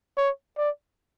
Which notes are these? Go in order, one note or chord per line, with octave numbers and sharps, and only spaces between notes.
C#5
D5